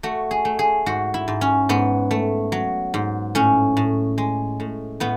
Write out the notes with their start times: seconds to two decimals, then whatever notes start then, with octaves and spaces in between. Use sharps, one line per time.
0.03 A3 F#4
0.31 G#4
0.45 A3
0.59 G#4
0.86 G#2 F#4
1.14 E4
1.28 G#2
1.41 C#4
1.69 G#2 B3
2.11 A3
2.52 F#3
2.94 G#2
3.35 A2 C#4
3.77 A2
4.18 G#3
4.60 A2
5.00 A2 B3